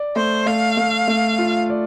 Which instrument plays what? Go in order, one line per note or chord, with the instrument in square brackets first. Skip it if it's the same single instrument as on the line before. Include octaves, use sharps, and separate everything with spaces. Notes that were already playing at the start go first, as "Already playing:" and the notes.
Already playing: [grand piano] D5
[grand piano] A3 [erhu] C5
[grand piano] A3 [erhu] F5
[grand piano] A3
A3
F4
D5